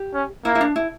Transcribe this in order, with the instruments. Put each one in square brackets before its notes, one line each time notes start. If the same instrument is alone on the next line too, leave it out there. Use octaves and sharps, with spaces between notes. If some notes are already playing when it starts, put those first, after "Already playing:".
Already playing: [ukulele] G4
[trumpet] C#4
[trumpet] A#3 [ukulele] E4
[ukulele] E4
D4
E4